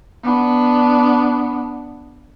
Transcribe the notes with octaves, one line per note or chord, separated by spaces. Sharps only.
B3 D4